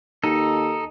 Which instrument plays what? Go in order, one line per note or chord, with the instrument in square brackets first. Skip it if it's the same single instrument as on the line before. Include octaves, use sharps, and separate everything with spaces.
[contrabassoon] D#2 [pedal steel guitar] D#4 A4